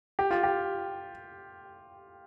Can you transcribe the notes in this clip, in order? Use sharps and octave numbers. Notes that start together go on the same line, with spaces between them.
G4
F4
G4